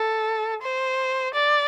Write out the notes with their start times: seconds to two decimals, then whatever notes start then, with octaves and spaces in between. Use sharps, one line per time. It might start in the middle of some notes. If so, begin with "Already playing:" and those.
Already playing: A4
0.62 C5
1.34 D5